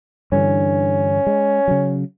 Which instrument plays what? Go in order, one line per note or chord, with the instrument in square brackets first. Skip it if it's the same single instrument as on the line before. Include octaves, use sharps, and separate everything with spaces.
[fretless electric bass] G2 D3 E3 [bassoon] C#4
[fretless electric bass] G#3
C#3 F#3